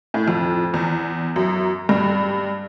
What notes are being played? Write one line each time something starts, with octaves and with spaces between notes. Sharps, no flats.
A2
F2
E2
F#2
G2